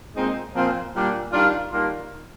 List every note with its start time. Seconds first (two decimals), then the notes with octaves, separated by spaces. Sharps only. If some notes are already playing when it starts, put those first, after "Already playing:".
0.14 A#2 G#3 C4 D#4
0.53 A#2 F3 C4 F4
0.93 A#2 G3 D4
1.31 D#3 G3 D4 F4
1.71 D#3 G3 A#3 D4 F4